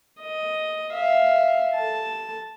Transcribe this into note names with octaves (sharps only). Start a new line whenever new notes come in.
D#5
E5 F5
A4 A5